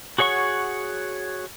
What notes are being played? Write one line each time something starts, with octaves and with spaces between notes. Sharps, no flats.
F#4 G#4 C#5 F#5 C#6